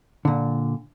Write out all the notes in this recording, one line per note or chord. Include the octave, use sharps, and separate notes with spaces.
A#2 D3